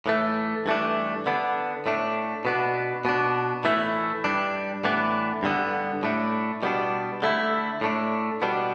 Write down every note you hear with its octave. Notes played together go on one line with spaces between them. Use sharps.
A2 E3 A3
G2 E3 A3 D4
D3 B3 D4
A2 A3 D4
B2 B3 D4
B2 B3 D4
A2 E3 A3 E4
G2 G3 D4
A2 E3 B3 D4
G2 D3 B3
A2 A3 D4
B2 G3 B3 D4
D3 A3 E4
A2 A3 D4
B2 G3 B3 D4